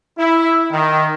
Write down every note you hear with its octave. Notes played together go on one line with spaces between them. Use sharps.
E4
D#3